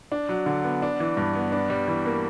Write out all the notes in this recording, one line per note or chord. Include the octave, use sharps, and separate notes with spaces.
D4
F#3
D3
B3
D4
E3
G2
B3
D4
G3
E3
A#3